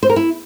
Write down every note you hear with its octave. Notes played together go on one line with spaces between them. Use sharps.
C5
A#4
E4